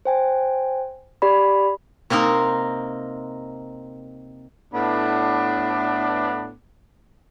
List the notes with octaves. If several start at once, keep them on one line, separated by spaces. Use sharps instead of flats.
C5 G5 G#5
G4 D5 B5
C3 A#3 C4 D#4 A#4
A2 B3 D4